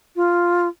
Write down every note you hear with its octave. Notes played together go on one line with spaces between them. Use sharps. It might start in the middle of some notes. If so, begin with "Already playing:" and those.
F4